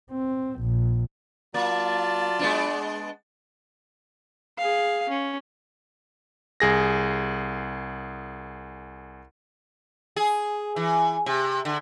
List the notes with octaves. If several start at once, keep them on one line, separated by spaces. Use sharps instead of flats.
C4
A#1
F#3 A#3 F4 D5 A5
G#3 B3 D4
G#4 F5
C#4
C2 G#4 A#6
G#4
E3
C3
D3